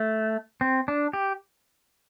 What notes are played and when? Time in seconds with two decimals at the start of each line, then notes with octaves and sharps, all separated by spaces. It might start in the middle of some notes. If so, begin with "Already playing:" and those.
Already playing: A3
0.61 C4
0.88 D4
1.13 G4